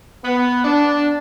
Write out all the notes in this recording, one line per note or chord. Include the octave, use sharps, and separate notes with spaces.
B3
D4